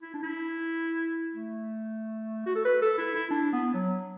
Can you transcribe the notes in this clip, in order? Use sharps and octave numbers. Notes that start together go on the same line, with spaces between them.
E4
D4
E4
A3
F#4
A4
B4
A4
E4
E4
D4
B3
F#3